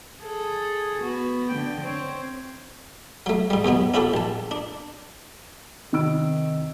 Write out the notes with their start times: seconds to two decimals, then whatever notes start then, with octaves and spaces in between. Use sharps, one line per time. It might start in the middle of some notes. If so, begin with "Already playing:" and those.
0.23 G#4 A4
1.02 B3 F#4
1.51 D3 G5
1.82 C4 C#5
3.26 F#3 A3
3.50 G#2 G3
3.65 D#2 B2 F#3 B3
3.94 C#4 E4 F#4 G4 A4
4.14 A#1 A5
4.51 D4
5.92 C3 D#3 D#4 E6 D7